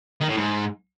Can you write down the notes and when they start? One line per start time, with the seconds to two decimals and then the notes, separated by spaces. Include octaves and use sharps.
0.21 D#3
0.29 A2
0.37 G#2